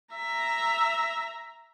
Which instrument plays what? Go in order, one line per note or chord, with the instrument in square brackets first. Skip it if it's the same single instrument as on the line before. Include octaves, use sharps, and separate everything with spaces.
[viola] E5 A#5